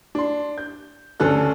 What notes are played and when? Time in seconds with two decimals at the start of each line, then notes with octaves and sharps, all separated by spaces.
0.15 D4 C6
0.58 G6
1.20 D2 C#3 C#4 D4 A4 F#6